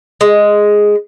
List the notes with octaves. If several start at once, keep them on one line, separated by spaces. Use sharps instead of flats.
G#3